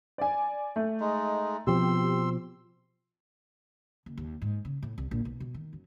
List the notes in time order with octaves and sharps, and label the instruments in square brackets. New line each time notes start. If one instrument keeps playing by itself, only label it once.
[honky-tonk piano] D5 G#5
A3
[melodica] G#3 D#4
[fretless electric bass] B2 F3 C4 [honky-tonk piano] G4 [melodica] C6 E6
[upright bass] F#1
D#2
G#2
C#3
A2
C2
A#1
B1
B2
D#3
F#2